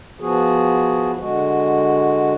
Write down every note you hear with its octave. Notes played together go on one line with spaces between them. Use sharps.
F3 B3 F#4 G#4
D3 G#3 F#4